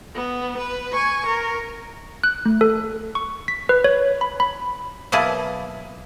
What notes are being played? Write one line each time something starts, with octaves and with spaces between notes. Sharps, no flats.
B3
B4
G#5 C#6
A#4
F#6
A3
A4
C#6
B6
B4
C#5
B5
B5
B2 F#3 A#3 E4 G#4 A5